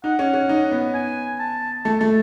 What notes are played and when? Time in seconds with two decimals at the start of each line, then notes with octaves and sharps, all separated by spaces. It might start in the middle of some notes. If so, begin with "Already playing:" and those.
0.04 D#4 F#5
0.19 C#4
0.34 C#4
0.49 D#4
0.71 B3
0.94 G#5
1.39 A5
1.85 A3 A5
2.00 A3 A5